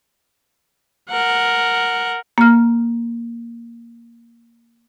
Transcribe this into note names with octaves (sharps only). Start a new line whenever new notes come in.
A#4 F#5
A#3 F6